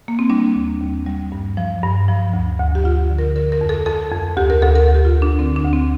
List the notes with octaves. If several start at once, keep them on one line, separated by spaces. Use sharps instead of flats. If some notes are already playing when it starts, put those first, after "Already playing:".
A#3
C4
G3 D4
D#2
D#2
G3
G2
F3
G2
F3
D2
D2
G4
D2 F4
D3
A#4
D3 A#4
A#4
F2
A4
F2 A4
F2
D2 G4
A#4
D2 A4
A#4
D2
G4
F4
D2
D4
D3 C4
D4
D2
C4